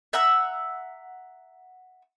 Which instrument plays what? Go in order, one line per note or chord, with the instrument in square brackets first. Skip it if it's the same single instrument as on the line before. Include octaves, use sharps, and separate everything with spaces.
[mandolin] E5 F#5 A#5 E6